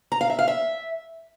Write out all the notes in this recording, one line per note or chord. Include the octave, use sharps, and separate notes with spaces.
A#5
F5
E5
F5
E5